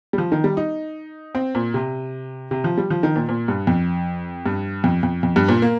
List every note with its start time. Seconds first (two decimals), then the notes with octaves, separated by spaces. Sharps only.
0.13 G3
0.18 F3
0.32 D#3
0.44 G3
0.57 D#4
1.35 C4
1.55 A#2
1.74 C3
2.51 C3
2.64 F3
2.78 G3
2.90 F3
3.03 D#3
3.16 A#2
3.29 A#2
3.48 G2
3.67 F2
4.46 G2
4.84 F2
5.03 F2
5.23 F2
5.36 G2
5.49 A#2
5.62 A#3